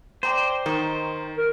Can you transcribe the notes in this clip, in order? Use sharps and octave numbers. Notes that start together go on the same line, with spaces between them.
C5 D5 G5 A#5
D#3 D#4 C#6
A#4